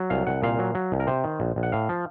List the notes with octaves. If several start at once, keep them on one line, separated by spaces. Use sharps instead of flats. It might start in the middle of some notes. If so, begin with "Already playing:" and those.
Already playing: F#3
C2 F5
C2 F#5
A#2 F5
F#3
F#3
C2
A#4
C3 C5
D#3
A#1
A#1
F#5
A2 F5
F3